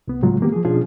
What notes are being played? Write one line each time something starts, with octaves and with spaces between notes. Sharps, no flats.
C2 B3
A2 C#3 F#3 G#3 F4
D#3 E3 A#3 B3 G4
F3 G#4
B2 F3 C#4 D4 F4 G#4